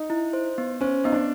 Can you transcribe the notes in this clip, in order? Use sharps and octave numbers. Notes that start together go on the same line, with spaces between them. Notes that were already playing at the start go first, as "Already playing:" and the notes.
Already playing: D#4
E4
C5
B3
C#4 C5
B3 D#4
D4